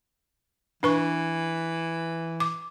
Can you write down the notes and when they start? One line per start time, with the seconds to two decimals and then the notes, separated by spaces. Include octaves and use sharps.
0.83 E3 D4 B4 C#6
2.40 D6